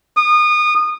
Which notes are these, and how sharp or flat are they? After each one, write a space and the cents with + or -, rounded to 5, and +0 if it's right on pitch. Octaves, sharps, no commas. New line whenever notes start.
D#6 -30